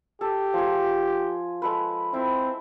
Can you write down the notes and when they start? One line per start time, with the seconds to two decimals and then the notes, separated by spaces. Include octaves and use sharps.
0.21 G4 A4
0.53 F3 G#4
1.62 G#3 A4 B4
2.14 C4 E4